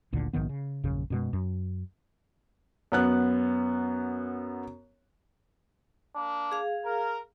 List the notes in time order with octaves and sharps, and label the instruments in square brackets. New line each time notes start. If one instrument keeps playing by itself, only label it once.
[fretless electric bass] G#1 D2 A#2 D3
A#1 G#2 D#3 B3
C#3
D#1 A#1 F#2 C#3
F#2 B2 G#3
F#2
[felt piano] F#2 B3 F#6
[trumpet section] A#3 D4
[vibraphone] G#4 F5
[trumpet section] A#4